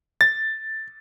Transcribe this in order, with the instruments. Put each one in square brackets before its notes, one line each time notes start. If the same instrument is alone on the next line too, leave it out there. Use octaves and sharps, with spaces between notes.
[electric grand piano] A6